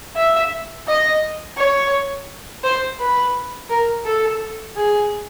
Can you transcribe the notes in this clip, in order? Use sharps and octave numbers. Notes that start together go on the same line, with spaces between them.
E5
D#5
C#5
C5
B4
A#4
A4
G#4